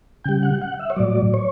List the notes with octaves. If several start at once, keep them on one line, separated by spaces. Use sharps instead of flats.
C#3 G3 G5
F#5
F#5
E5
C#5
A2 F#3 D5
C#5